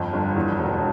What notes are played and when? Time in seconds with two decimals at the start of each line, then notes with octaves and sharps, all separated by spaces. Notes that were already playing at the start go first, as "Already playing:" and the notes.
Already playing: G1 F2
0.13 G1
0.35 E2
0.59 E1